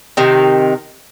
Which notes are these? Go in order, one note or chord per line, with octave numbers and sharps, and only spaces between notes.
C3 D#3